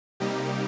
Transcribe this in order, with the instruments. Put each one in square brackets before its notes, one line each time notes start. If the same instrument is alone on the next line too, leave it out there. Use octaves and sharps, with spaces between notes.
[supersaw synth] C3 G3 A#3 D#4 G4